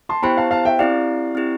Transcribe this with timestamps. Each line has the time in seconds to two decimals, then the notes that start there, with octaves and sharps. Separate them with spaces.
0.09 A5 C6
0.23 B3 E4 G4 C5 G5 B5
0.37 F5 A5
0.51 F5 A5
0.65 E5 G5
0.79 C4 E4 G4 D5 F5
1.35 C4 E4 G4